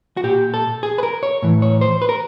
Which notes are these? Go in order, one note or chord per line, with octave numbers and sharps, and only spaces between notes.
F#4
A#2 G4
A4
G#4
B4
A#4
C#5
A2 E3
C#5
C5
B4
A#4